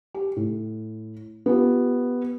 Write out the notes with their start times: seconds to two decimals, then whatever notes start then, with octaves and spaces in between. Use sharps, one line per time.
0.14 G4
0.36 A2
1.46 B3 F4 G4